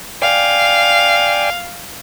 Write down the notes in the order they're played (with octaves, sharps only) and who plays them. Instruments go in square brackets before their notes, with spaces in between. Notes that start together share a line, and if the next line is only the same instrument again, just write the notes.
[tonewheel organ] D5 G5 G#5 [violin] F5